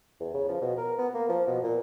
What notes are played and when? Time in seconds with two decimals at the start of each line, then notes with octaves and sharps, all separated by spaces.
0.20 E2
0.34 C#3
0.49 F3
0.61 B2
0.78 A#4
0.99 B3
1.14 A#3
1.29 F3
1.47 B2
1.64 A#2